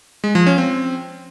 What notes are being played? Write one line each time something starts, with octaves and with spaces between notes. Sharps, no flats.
G#3
F3
C#4
C4